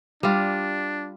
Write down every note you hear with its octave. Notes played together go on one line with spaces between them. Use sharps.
G3 D4 F4